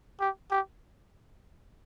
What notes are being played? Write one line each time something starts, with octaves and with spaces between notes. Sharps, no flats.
G4
G4